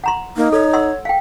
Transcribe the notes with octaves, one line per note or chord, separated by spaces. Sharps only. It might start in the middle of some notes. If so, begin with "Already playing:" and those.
F#5 A#5 C6
A#3 D#4
A4 C#5
F#5 C6 E6
F5 G5